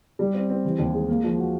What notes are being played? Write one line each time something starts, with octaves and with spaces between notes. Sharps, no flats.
G3
C4
C4
E3
D#2
G#3
A#3
F3
F#4